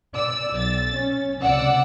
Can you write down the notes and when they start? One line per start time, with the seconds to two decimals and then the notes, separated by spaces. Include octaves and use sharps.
0.13 D5 E6
0.54 B1 A6
0.94 C#4
1.42 C#2 C3 D5 F#5 E6